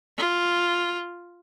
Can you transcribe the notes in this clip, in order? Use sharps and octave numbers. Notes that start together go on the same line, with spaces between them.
F4